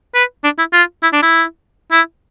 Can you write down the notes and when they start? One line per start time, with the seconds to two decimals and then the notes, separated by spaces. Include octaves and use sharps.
0.15 B4
0.44 D4
0.58 E4
0.73 F4
1.03 E4
1.13 D4
1.23 E4
1.92 E4